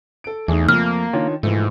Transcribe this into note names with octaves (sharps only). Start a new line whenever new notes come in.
A4 D7
E2 E3 A3 D#4 G#4
F2 F3 A3 A#3 F4 F6
D#3 D4 F4 C#5
G#2 B2 E3 F3 A3